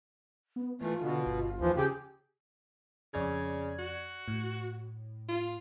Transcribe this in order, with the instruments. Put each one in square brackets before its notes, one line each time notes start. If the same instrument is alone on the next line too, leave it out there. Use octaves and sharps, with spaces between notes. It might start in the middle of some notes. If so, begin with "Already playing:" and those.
[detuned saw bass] B3
[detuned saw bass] A#2 [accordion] E3 A3 [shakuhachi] F4
[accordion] B2 [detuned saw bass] D3
[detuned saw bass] G1
[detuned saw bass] D#2 [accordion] E3 F3
[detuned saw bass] C#3 [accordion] G4 [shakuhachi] G#4
[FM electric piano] F2 D5 G#6 [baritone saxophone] C#3
[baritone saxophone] F#4
[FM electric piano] A2
[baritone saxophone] F4